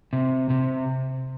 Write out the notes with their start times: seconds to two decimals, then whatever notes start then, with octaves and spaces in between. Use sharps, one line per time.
0.13 C3
0.50 C3